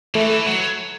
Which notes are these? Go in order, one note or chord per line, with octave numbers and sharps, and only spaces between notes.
E3 A3
F#3